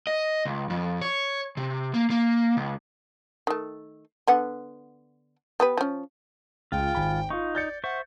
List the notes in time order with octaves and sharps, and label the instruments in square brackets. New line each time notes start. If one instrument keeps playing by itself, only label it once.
[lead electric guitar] D#5
C#2
F2
C#5
C3
A#3
A#3
C#2
[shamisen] D#3 A3
D3 B3 F#5
B3 G4 B4
F3 C#4
[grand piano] C#2 [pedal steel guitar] F4 [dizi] G5
[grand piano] G#1 G#5 B5
[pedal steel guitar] D#4 [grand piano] F4 C#6
[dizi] D5 [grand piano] G6 A6 C#7
[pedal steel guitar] C5 E5 C#6 [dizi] F#5